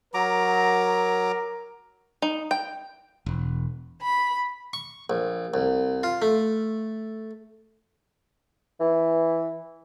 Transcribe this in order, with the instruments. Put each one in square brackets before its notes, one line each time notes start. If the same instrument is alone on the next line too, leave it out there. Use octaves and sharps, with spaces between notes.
[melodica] F#3 A#5 D6 [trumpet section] A#4
[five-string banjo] D#4
G5
[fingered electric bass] E1
[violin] B5
[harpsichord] C#6
A#1
C2
F4
A3
[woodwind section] E3